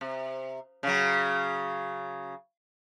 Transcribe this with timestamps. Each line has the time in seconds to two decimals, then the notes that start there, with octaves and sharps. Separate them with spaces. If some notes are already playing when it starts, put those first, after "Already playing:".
0.01 C3
0.83 C#3 F#3